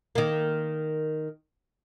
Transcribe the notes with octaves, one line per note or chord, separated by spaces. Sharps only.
D#3 A#3